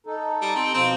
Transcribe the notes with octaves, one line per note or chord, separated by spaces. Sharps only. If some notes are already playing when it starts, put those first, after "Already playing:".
D#4 A4
G3
C4
B2 F3 C4